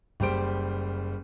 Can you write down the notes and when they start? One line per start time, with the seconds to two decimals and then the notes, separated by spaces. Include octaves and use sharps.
0.20 F#1 G3 G4 C5 D7